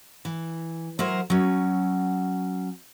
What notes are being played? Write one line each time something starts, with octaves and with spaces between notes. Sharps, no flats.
E3
F#3 E4 A#4 C5
F#3 C#4